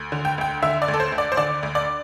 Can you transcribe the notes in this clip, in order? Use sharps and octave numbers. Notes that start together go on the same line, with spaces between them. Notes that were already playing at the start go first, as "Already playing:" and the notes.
Already playing: D2
D3
G5
D2 G5
D3 E5
D5
D2
A4
C5
D2
D5
C5
D3 D5
D2
D5